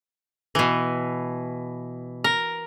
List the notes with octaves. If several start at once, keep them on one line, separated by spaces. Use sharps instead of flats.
B2 E3
A#4